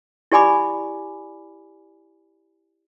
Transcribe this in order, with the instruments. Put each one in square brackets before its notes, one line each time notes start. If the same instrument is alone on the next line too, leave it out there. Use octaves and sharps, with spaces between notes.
[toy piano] E4 G4 D5 G#5 B5 D6